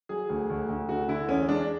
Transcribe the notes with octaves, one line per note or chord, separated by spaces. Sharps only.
F#3 G#4
D2
D2
D2
D3 F#4
D3 E4
E2 C#4
G#3 D4